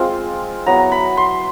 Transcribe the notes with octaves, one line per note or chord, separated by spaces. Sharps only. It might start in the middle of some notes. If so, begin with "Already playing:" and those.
Already playing: G#3 C4 F4
F#3 B3 E4 A#5
B5
C6